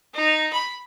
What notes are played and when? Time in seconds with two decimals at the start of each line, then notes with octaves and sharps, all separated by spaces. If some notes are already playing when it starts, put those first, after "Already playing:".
0.14 D#4
0.53 B5